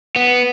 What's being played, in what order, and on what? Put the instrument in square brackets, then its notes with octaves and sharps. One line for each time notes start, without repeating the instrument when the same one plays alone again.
[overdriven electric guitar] B3